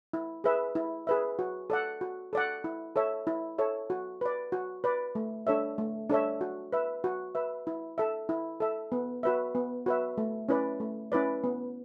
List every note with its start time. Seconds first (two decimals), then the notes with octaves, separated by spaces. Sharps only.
0.13 E4
0.44 G#4 B4 E5
0.75 E4
1.07 G#4 B4 E5
1.39 F#4
1.70 A4 D5 F#5
2.01 F#4
2.33 A4 D5 F#5
2.64 E4
2.96 A4 C#5 E5
3.27 E4
3.58 A4 C#5 E5
3.90 F#4
4.21 B4 D5
4.52 F#4
4.84 B4 D5
5.15 A3
5.47 D4 A4 C#5 E5
5.78 A3
6.10 D4 A4 C#5 E5
6.41 F#4
6.72 B4 E5
7.04 F#4
7.35 B4 E5
7.67 E4
7.98 A4 E5
8.29 E4
8.60 A4 E5
8.92 B3
9.23 F#4 B4 E5
9.55 B3
9.86 F#4 B4 E5
10.18 A3
10.49 C#4 E4 B4 D5
10.80 A3
11.12 C#4 E4 B4 D5
11.44 B3